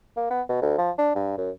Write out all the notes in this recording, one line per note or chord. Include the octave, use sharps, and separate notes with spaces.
A#3
B3
B2
D2
F3
D4
G2
F#2